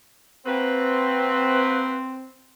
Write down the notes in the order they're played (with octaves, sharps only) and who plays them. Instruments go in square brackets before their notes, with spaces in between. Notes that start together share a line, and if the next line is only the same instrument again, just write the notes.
[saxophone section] A#3 F#4 B4 [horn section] C4